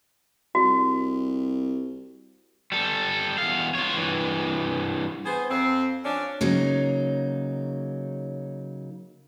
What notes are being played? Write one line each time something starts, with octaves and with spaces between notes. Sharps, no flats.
C2 F#4
G3 A4
E2 F5
F4 C#5
G2 E3
B3 G#4 C5
F2 C4
F3 C#4 D4
C#3 F#3 A#3 D#4